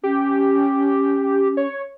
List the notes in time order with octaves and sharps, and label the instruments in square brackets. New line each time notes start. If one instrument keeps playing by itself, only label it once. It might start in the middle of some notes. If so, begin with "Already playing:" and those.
[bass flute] C#4 [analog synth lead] G4
[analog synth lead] C#5